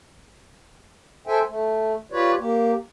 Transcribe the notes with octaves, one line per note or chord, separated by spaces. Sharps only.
A4 C5 E5 G5 G#5
A3
F4 G4 B4 C#5 D5
A#3 G4